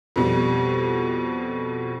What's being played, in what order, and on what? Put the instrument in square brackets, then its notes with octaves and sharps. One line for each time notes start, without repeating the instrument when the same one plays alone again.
[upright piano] F2 B2 G3